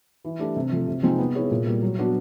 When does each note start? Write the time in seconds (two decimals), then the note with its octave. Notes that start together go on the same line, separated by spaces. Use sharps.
0.25 E3
0.39 A3 D4 G4
0.56 C3
0.72 F3 A3
0.87 C3
1.03 F3 G#3 C4 D#4
1.18 B3
1.35 E4 G#4 C#5
1.51 A#2
1.66 G3 A#3
1.82 F#3
1.98 B3 D4 F#4